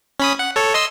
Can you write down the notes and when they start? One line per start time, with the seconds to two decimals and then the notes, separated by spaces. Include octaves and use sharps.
0.20 C#4 B5 D#6
0.39 F#5
0.56 A4 C#5
0.74 D#5 C6 E6